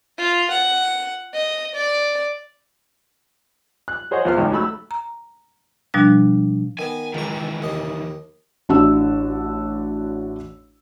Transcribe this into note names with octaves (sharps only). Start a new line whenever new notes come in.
F4
F#5
D#5
D5
F#6
G#4 C5 C#5 D#5 F#5
E2 F3 F4 B4 F6
G#1 C#2 C#4 D#5 G5
F#3 A3 B5 E6
A#5
B2 F3 G3 D4 F#6
D#3 B3 G#5
C#2 D#3 E3 C#6
D#2 D#5
A1 D4 E4 F#4 E6